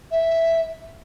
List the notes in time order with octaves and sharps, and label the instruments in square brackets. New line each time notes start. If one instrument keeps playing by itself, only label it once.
[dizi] E5